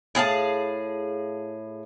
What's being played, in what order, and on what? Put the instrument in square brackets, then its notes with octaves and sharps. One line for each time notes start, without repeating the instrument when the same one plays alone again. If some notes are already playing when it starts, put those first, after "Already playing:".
[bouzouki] A2 G#4 F5 A5